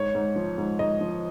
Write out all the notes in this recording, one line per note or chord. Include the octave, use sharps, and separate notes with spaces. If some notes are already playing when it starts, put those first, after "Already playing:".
Already playing: G#2 C#5
G#2
F3
G#2
G#2 D#5
F3